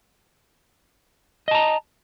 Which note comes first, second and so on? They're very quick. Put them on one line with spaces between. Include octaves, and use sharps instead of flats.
D#5 A5 A#5